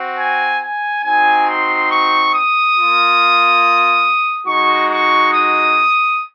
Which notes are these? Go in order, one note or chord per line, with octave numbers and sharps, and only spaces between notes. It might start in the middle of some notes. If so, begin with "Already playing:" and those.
Already playing: C4 F#4
G#5
G#5
C4 D#4 F#4 G#5
C6
C#6
D#6
A#3 F4
G#3 D#4 F#4 C#6
C#6
D#6